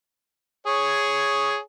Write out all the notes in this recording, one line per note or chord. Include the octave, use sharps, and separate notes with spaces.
G#4 C#5